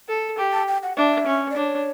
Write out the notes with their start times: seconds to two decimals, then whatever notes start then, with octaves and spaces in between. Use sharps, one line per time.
0.08 A4
0.38 G4
0.52 A5
0.68 G5
0.83 F#5
0.97 D4 E5
1.27 C#4
1.51 D5
1.56 D4 C#5